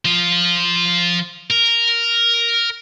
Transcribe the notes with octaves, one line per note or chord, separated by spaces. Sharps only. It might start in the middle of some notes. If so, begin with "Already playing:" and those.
F3 F4
A#4